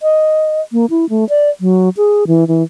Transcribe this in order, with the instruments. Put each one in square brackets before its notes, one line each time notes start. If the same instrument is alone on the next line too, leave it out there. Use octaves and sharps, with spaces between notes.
[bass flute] D#5
A#3
E4
A3
D5
F#3
G#4
E3
E3